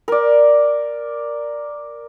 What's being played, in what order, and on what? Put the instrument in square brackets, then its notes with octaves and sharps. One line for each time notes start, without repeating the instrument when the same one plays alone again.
[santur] A#4 D5